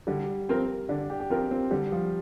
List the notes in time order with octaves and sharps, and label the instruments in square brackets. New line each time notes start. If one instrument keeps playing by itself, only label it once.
[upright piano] D3 [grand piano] G3
[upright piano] F3 C4 A#4
[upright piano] D3 [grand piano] D4
[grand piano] G4
G4
[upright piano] F3 C4 A#4 [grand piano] F4
[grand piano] C4
[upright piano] D3 [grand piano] G3
[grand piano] F3